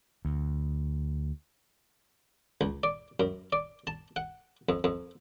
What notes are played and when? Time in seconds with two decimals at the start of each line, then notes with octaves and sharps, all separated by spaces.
0.25 D2
2.61 C#2
2.83 D5
3.20 F#2
3.53 D5
3.87 A5
4.16 F#5
4.69 F2
4.84 F2